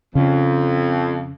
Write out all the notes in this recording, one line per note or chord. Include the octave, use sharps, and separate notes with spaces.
F2 C#3